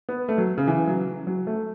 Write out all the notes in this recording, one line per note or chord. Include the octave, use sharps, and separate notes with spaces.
B3
A3
F#3
C#3
E3
F#3
F#3
A3